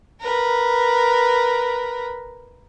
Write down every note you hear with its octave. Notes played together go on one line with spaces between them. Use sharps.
A#4 B4